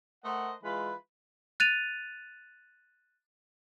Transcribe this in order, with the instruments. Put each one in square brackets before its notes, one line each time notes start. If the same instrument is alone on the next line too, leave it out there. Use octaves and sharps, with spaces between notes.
[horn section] A3 A#4 C5 D#5 F#5
E3 G#3 F4 B4 B5
[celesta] F#6 A6 D#7 F7